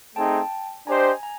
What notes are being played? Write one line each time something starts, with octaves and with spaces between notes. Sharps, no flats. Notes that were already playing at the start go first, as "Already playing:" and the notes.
A3 C4 D#4 G#4 G5 A5
D4 G4 C5 D#5 G#5 A#5
G#5 A#5